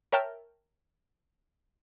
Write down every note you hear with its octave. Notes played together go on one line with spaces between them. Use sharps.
A#4 C#5 E5 G5 A5 F6